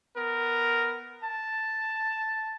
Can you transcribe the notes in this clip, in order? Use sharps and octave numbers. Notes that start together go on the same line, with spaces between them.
B3 A#4
A5